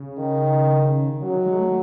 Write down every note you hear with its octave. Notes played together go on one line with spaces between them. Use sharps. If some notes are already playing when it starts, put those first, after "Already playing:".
Already playing: C#3
D#3
C#3 F#3
D#3
G#3
A3